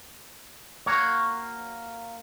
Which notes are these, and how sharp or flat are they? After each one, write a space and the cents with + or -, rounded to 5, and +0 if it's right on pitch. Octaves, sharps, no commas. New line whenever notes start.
A#3 -10 F#4 +0 C#5 +0